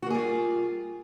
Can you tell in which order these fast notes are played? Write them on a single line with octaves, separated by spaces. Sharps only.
F#4 A#3 G#4 G3 F4